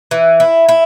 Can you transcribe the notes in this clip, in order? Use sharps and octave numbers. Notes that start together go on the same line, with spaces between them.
E3
E4
E4